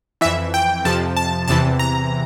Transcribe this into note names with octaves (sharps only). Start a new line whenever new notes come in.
F2 E3 E5
G5
F2 C3 F3 A5
A5
E2 C3 E3 A5
A#5